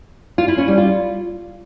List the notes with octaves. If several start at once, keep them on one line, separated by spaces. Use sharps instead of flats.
F4
E4
C#4
G3
F4